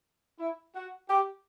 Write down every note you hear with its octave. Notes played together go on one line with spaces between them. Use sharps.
E4
F#4
G4